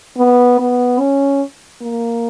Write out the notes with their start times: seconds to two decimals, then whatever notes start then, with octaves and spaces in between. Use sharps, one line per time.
0.18 B3
0.60 B3
0.99 C#4
1.82 A#3